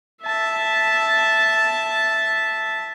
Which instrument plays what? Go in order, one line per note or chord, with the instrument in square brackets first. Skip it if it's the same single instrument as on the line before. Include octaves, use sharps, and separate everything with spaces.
[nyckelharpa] E5 A5